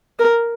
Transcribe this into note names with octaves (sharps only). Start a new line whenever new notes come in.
A#4